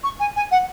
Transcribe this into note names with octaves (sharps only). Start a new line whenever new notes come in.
C#6
G#5
G#5
F#5